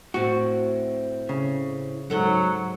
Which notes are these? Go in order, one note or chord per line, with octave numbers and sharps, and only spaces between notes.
A2 C4 F#4
C#3
G#2 F#3 A4 F#5